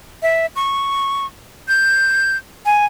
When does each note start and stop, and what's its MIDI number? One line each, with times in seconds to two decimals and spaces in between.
0.23 0.46 76
0.56 1.26 85
1.68 2.37 91
2.66 2.86 80